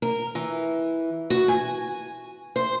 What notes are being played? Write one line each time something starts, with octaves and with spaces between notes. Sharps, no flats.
A#4
E3
F#4
G#5
C5